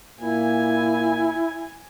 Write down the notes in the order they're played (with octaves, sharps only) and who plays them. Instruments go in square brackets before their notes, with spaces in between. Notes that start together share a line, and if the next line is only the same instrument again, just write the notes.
[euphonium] A#2 [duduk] E4 [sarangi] G#5